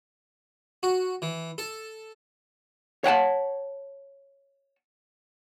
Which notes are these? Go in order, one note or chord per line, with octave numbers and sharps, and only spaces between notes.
F#4
E3
A4
C#5 F#5 G5 A5